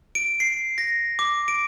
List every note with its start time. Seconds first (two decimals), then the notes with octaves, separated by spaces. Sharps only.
0.15 D7
0.40 C7
0.78 A#6
1.19 D6
1.48 D7